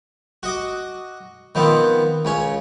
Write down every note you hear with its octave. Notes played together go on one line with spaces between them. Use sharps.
F#4 D#5 D6
D#3 F3 B3 C4
C#2 C#4 C#5